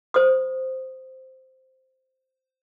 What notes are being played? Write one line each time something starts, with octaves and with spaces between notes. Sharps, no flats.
C5 D#6